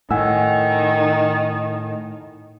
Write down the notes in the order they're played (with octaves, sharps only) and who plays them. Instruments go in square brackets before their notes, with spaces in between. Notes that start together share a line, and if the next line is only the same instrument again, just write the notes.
[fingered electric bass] A2 [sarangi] D#3 [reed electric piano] F#5 G#5 E6